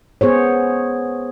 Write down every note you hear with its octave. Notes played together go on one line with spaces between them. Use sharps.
B3 G#4 C5 C#5